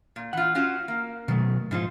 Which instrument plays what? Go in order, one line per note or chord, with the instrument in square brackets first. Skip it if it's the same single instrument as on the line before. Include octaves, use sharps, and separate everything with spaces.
[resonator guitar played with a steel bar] A#2
[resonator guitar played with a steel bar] E3 F4 [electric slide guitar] F#5
[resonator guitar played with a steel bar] C#4 F4 F#4
A#3
[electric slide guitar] B2 F#3 A3 [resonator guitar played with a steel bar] D#3
[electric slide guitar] G#2 F3 F4 [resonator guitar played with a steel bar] B2 D#4 C5